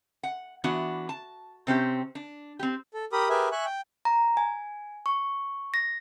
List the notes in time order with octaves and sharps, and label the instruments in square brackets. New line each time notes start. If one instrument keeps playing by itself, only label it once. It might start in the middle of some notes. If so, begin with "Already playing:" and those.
[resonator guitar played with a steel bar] F#5
E3 B3 D4 F#4
A5
C3 C4 C#4 G4
D4
C4 G4
[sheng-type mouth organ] A4
G4 A#4 B5 D#6
G4 G#4 A#4 B4 E5 G#5
E5 G#5 C#6 F#6
G5
[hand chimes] A#5
G#5
C#6
A#6